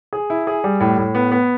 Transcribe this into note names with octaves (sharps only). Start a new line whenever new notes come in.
G#4
E4
G#4
G3
A2
A2
B3
B3